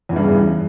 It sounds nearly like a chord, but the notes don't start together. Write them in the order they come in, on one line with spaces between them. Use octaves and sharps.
E2 E3 G2 C#3